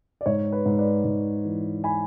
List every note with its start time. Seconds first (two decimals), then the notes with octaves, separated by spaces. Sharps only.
0.21 D5
0.26 G#2 C#5
0.52 B4
0.66 G#2
0.78 B4 D5
1.04 G#2
1.45 E3
1.84 G#5 B5